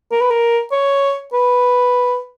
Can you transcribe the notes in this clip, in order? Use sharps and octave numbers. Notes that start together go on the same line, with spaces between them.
A#4
B4
A#4
C#5
B4